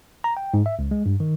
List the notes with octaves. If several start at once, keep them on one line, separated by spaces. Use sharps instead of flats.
A#5
G5
G#2
E5
C#2
G#3
G2
D#3